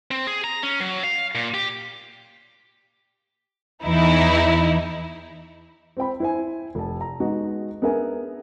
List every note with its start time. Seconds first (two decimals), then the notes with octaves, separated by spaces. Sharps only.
0.11 C4
0.27 G#4
0.44 A#5
0.63 C#4
0.80 F#3
1.03 F5
1.35 A#2
1.54 G4
3.84 E2 E3 D#4 E4
5.97 C4 C5 G5 B5
6.20 E4 C5 G#5
6.75 F1 A5
7.01 A#5
7.20 G#3 B3 D#4 F#4
7.82 B3 D4 G#4 A#4 E5 G#5